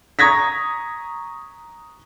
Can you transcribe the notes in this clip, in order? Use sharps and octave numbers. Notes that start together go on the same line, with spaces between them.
A#5 C#6 D#6 G#6 A#6 B6